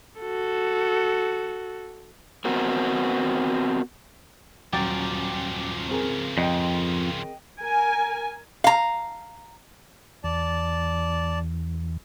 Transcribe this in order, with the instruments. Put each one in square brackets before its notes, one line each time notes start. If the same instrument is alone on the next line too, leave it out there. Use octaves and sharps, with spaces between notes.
[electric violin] F#4 A4
[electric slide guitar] B3 C4 F#4 A#4
[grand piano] D#1 F#3 A6 [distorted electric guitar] C#3 F3 [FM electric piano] G5 D6
[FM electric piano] C4 G#4 A#4
[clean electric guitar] F2 [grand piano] D#5 G5
[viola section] A#4 G#5
[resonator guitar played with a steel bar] F5 A#5
[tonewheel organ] E2 [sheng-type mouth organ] D5 A5